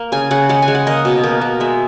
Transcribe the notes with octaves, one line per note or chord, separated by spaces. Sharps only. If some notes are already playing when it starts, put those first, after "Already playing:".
Already playing: A#3
C#3 G#5
C#3 F#5
G#3 F#5
G#5
G#3
F#5
A#3 D#5
B2
A#3
A#3
G#3 E5